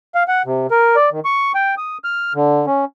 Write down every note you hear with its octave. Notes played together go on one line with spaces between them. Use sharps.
F5
F#5
C3
A#4
D5
D#3
C#6
G5
D#6
F6
D3
C#4